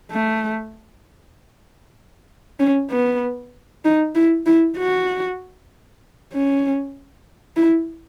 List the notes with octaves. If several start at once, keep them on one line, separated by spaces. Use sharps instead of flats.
A3
C#4
B3
D#4
E4
E4
F#4
C#4
E4